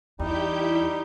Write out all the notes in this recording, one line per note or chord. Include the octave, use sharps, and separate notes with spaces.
E2 G3 D#4 E4 G4 G6